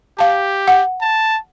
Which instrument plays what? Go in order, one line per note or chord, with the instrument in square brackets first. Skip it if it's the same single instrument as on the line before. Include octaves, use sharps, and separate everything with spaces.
[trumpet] G4 [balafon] F5 A5
[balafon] F#5
[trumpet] A5